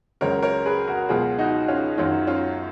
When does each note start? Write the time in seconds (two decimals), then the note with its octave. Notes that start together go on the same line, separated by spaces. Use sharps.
0.21 C#2 C#3 F#3 A#4 C#5
0.43 A#4 C#5
0.65 G#4 B4
0.88 F#4 A#4
1.09 C#2 B2 F#3 F4 G#4
1.38 D#4 F#4
1.68 C#4 F4
1.98 F#2 D#3 F#3 C#4 F4
2.27 C#4 F4